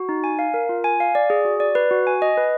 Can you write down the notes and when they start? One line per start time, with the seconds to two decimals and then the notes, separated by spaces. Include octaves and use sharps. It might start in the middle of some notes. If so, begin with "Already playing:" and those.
Already playing: F#4
0.09 D#4
0.24 G#5
0.39 F5
0.54 A#4
0.69 F4
0.84 G#5
1.00 F5
1.15 D5
1.30 G#4
1.45 F#4
1.60 D5
1.75 B4
1.91 F#4
2.07 G#5
2.22 D#5
2.37 B4